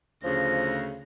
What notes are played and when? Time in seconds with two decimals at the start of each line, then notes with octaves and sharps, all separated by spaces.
0.24 D2 C#3 F3 A#6